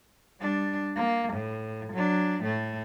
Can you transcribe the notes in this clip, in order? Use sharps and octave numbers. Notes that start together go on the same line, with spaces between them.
G3 D4
A#3
A2
F#3 D4
A2 A3